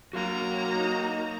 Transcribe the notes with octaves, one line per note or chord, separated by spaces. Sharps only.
F#3 A#3 F#4 F5 A#5
D#4